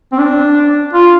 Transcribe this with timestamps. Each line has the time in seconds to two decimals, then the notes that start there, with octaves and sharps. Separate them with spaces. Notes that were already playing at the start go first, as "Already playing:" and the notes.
0.12 C4
0.19 D4
0.93 F4